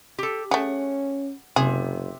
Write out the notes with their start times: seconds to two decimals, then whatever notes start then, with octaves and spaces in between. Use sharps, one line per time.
0.19 G4 A4
0.51 A3 C#4 G#4 F#5
1.56 F#1 C3 G#4